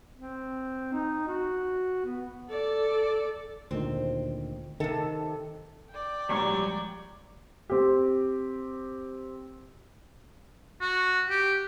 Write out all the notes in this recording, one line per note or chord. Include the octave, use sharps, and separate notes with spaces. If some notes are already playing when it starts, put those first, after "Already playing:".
C4
D#4
F#4
B3
A4 D5
D2 A#2 D#3 C4
C3 D#3 A4
D5 G5
A#1 G#2 F#3 G3
C4 G4
F#4
G4